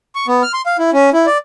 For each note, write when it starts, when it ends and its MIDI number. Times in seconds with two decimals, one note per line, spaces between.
0.15 0.27 85
0.28 0.42 59
0.43 0.52 89
0.54 0.62 84
0.66 0.77 77
0.79 0.90 64
0.93 1.10 61
1.13 1.26 64
1.26 1.38 74